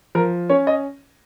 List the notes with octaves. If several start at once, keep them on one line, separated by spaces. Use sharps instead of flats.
F3 A#4
C#4 C#5
D#5